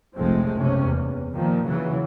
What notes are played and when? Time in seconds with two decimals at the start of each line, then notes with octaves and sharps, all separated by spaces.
0.16 F1 A#1 F3 G#3 A3 C4
0.57 F#1 B1 C3 C#4
0.85 E2
1.34 A#2 D#3 F3
1.67 C#3 E3 F#3